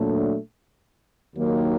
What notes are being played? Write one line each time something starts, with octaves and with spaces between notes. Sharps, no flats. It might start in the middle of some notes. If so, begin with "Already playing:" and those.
Already playing: A#2 F#3 A3 D4
D#2 D#3 F#3 A#3